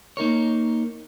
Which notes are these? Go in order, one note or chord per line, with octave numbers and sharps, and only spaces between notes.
A#3 D#4 A#4 C#5